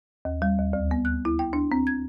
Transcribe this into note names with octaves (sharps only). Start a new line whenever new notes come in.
D#2
G3
D#2
D2
B3
F#6
E4
G5
D4
C4
G#6